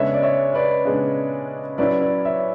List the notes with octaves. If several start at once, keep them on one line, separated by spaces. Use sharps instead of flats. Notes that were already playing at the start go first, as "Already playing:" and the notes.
Already playing: C#3 G#3 B3 D4 C#5 E5
D5
C#5 E5
B4 D5
C#3 G#3 B3 D4
F#3 C#4 E4 B4 D5
B4 D5
C#5 E5